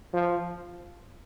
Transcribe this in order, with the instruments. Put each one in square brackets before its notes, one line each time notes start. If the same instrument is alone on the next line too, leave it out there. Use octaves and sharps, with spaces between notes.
[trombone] F3